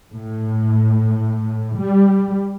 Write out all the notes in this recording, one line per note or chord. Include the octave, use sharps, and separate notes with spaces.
A2
G3